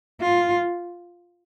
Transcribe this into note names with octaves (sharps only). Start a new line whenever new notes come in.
F4